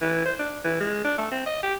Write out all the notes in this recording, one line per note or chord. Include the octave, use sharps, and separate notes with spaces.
E3
C5
D4
E3
G#3
D4
A3
C4
D#5
G4